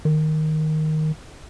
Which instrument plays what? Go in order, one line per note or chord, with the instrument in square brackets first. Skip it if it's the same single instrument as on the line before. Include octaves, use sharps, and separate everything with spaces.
[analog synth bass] D#3